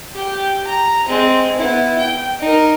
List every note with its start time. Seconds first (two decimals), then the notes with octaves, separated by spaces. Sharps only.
0.14 G4 G5
0.67 A#5
1.08 G#3 C4
1.58 B3 E4
1.98 G5
2.40 D#4 A#4